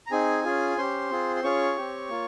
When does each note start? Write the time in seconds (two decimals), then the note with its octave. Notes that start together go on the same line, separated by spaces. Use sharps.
0.07 A#5
0.11 C4 D#4 G#4 G#5
0.44 C#4 F4 G#4
0.78 C#4 G4 C5 C6
1.11 C4 F4 G#4
1.36 C6
1.43 C#4 F4 G#4 C#5 C#6
1.77 C4 G4
2.10 A#3 F4